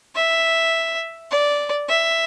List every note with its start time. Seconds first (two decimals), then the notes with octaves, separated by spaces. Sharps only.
0.15 E5
1.31 D5
1.89 E5